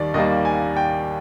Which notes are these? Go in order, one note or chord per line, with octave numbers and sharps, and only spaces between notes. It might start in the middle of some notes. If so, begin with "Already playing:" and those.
Already playing: D#2 D#3 G3 D5
D#2 D#3 G3 A#3 D#5
G#5
G5